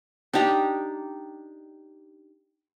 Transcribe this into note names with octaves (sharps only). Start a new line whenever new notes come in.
D4 D#4 G4 A#5